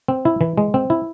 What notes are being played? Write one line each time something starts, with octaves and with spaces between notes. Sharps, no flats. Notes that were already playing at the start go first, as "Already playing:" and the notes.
C4
E4
E3
G#3
C4
E4